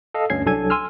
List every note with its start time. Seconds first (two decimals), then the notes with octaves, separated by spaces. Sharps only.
0.14 A4 D#5 F5
0.30 D2 G2 C#4 G#6 C7
0.46 C2 F#3 D4 A4 G#5 G#6
0.70 G#5 C6 E6 F6